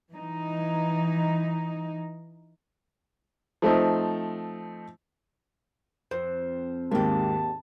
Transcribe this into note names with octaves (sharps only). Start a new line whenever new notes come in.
E3 D#4
F3 A3 C4 D#4
F2 C5
G#1 D#2 G#2 A#3 G4 A5